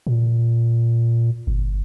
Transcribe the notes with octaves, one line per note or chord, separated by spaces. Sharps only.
A#2
G1